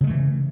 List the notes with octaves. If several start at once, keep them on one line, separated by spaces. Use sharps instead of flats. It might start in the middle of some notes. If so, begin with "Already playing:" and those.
C#3 E3 G#3 A3